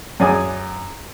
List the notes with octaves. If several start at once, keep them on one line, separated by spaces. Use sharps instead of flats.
F#2 C#4 G#4 D5 G#5 D#6